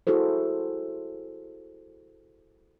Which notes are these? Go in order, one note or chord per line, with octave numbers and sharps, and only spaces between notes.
E4 F#4 G#4 A4 C5